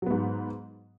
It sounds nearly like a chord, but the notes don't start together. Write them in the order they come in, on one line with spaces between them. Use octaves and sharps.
F#3 B3 G#2